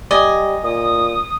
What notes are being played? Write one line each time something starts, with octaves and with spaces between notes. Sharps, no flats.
G3 D5 D#5 G#5
A#2 D#6